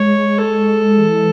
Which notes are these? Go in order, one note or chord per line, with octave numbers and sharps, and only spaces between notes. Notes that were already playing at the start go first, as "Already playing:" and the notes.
Already playing: G#3 C#5
A4
E3